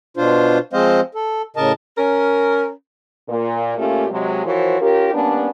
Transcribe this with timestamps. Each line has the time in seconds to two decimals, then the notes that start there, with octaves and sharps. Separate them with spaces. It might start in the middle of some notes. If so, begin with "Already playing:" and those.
0.17 B2 D4 F4 C5
0.73 F3 G#3 C4 C5 D#5 F5
1.15 A4
1.56 A2 C#3 A#4 D#5 A5
1.97 C#4 A#4
3.28 A#2
3.77 A#2 A3 A#3 C#4 F4 G4
4.09 C3 F#3 G#3
4.44 E3 F3 F#4 A#4 C5 C#5
4.80 C#4 F4 G4 A#4
5.13 G3 A#3 B3 C#4 D4